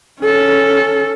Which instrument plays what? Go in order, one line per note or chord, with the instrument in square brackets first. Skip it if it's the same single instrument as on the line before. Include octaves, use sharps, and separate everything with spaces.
[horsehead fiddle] C#4 A4